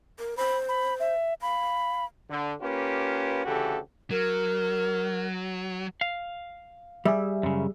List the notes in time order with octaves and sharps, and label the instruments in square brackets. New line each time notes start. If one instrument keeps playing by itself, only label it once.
[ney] A#4
[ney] C5 [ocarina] B5
[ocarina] B5
E5
[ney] F5 [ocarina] B5
[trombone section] D3
A#3 C#4 F4 G4 B4
D2 C#3 E3 F#4 G4 A4
[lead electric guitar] F#3 [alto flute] A#4
[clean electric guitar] F5
[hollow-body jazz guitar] G3 [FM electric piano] G#4 E5
[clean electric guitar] F#2 C#3